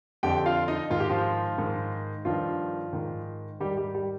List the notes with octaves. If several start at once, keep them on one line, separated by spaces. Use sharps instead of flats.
F2 D3 G4 G5
F4 F5
D#4 D#5
G#2 D#3 F4
G4
F3 F4
G#2 D#3
G2 D#3 F3 F4
G#2 D#3
G#2 D#3 G3 G4
G3 G4
G3 G4